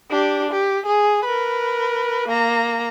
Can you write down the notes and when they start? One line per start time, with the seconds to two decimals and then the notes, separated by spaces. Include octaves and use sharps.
0.11 D4 G4
0.51 G4
0.86 G#4
1.25 A#4 B4
2.28 A#3 A#5